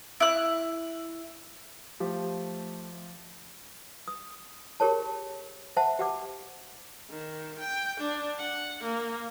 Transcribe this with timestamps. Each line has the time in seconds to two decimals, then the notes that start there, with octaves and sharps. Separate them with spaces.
0.20 E4 F#6
2.00 F3 A3 G4
4.08 D#6
4.80 G4 G#4 A#4 C#5 A5
5.77 C5 E5 F#5 A5
5.99 G4 F#5 D6
7.10 D#3
7.59 G5
8.00 D4
8.38 F#5
8.83 A#3